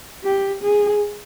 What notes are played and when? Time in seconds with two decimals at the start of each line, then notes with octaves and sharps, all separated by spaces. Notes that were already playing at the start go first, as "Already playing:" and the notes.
0.23 G4
0.63 G#4